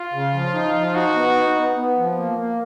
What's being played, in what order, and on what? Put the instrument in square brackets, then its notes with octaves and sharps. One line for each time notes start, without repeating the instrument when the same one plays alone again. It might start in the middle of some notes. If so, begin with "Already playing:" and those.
Already playing: [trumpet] F4
[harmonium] C#3
F3
D#4
F3
[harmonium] D#4 [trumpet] F#4
[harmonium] B3
D#4
B3
B3
F3
A#3
A#3